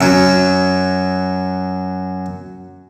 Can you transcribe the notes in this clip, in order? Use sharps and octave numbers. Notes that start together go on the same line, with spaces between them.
F#2 F#3